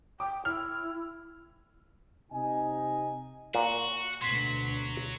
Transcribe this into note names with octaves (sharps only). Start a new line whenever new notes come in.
G5 D6
E4 F6
C3 D#4 D#5 G#5
A#2 F#4 A#4
D2 B2 F#3 C6 B6 C7